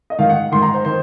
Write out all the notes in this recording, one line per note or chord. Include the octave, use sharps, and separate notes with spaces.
D#5
G#2 D#3 F5
F#5
G#2 D#3 C6
A#5
C5
D#3 C5